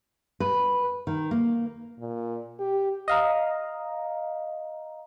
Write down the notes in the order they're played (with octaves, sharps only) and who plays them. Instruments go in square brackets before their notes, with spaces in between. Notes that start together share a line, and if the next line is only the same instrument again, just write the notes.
[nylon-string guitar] B4
D#3
A#3
[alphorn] A#2
G4
[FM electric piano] D#5 F5 A#5